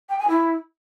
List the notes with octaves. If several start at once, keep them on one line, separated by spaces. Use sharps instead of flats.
G5
G#5
E4